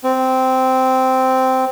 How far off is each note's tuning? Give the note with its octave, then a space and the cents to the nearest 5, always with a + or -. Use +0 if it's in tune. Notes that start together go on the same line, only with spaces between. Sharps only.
C4 -10